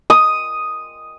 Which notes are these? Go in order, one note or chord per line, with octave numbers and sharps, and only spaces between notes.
D#6